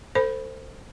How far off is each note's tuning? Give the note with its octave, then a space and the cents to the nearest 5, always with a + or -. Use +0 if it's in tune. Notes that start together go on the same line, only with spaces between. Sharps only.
A4 +35 C5 +0 B5 +0